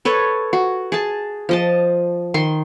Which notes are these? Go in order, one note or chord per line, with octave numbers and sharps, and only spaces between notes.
A4 B4 C#5
F#4
G#4 A5
F3 D#5 A5
D#3 C6